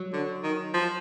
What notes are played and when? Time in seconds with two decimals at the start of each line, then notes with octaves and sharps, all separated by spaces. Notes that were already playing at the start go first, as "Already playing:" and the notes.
Already playing: F#3
0.13 D3
0.43 D#3
0.74 F3